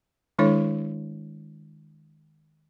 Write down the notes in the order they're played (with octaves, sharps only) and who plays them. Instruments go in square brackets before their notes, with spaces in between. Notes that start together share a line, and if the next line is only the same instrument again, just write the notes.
[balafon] D#3 G#3 D4 E4 A4 C#5